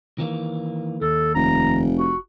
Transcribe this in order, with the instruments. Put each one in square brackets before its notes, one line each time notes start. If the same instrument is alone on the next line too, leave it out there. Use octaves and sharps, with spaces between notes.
[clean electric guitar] D#3 E3 A#3
[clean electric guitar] D#2 [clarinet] A4
[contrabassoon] F1 [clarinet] A#5
[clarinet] F#4